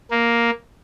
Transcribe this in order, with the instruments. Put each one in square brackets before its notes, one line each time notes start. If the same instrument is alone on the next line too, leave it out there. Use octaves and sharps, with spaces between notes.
[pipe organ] A#3